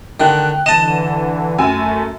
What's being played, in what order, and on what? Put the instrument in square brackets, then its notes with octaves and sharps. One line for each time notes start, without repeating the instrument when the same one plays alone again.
[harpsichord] D3 D#3 [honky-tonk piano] G5 F#6
[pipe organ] D3 E3 [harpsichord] D#5 A5 [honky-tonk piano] E7
[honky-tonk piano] F#2 G#5 E6 [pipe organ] A3